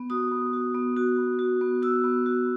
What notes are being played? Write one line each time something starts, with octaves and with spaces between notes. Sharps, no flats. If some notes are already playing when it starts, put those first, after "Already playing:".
Already playing: B3
F#4 D#6
B3
F#4
B3
F#4
B3
F#4
B3
F#4 E6
B3
F#4